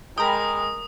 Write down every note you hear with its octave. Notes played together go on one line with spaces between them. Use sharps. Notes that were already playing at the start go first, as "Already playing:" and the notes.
G#3 A#4 G5 A#5 B5 D#6